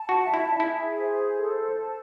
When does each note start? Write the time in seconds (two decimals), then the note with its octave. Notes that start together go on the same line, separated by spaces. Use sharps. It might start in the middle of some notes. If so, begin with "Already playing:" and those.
Already playing: A5
0.09 F#4
0.22 E5
0.34 E4
0.60 E4 G#4
0.98 C5
1.36 A4
1.75 A5